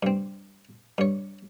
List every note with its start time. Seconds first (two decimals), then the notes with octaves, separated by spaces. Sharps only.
0.03 G2 C4
0.98 G2 C#5